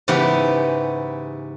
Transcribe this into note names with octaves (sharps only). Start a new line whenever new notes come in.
G#2 C#3 E3 B3 G4